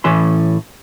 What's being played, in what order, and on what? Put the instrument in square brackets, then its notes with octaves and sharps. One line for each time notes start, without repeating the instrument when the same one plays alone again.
[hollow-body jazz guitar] A2 E3 C#4 E5 C6